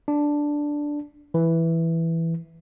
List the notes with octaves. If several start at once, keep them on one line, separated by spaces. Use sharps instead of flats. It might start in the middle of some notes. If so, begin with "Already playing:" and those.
D4
E3